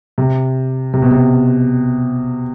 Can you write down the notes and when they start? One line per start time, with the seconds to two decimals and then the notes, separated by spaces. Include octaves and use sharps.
0.18 C3
0.94 C3
1.02 B2
1.11 C3